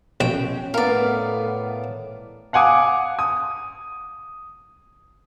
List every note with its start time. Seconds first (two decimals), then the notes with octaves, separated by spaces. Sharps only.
0.20 A#1 B2 C#4 G5
0.74 A2 B3 A#4 D5 F5
2.53 F5 F#5 G#5 D6 D#6
3.19 D#6